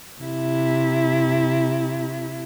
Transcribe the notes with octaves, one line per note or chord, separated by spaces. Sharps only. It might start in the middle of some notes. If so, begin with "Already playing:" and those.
C3 E4